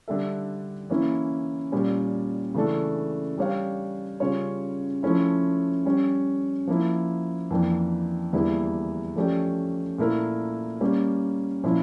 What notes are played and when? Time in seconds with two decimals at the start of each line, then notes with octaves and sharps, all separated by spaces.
0.08 D3 G3 D4 A4 E5
0.90 E3 A#3 C#4 E4
1.72 A#2 G3 C#4
2.55 C#3 E3 A3 D4 A4
3.38 G3 D4 G4 C#5 F5
4.20 C#3 G3 C#4 F4 C#5
5.03 F3 A3 C#4 E4
5.85 G3 C#4 G4
6.67 F3 A#3 E4
7.51 F2 E3 A#3 D4
8.33 E2 D3 G3 A#3 E4
9.16 F3 A3 C#4 G4 D5
9.98 A#2 A3 E4 A#4
10.81 G3 A#3 C#4
11.64 A#2 F3 C#4 E4